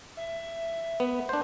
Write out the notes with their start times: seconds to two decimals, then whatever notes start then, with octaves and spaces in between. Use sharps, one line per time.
0.17 E5
1.00 B3
1.29 D4 C5